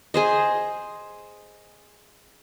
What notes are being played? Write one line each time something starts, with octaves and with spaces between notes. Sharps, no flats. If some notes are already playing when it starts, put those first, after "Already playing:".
G#4 C5 D#5